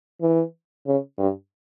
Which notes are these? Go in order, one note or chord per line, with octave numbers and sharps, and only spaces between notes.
E3
C#3
G2